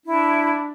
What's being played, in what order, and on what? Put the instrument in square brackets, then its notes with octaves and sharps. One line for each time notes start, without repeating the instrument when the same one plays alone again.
[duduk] D4 [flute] E4